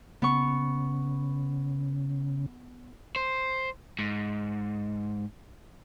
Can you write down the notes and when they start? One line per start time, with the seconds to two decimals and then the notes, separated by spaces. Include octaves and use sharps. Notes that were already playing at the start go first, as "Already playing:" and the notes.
0.22 C#3 B3 C#6
3.16 C5
3.99 G#2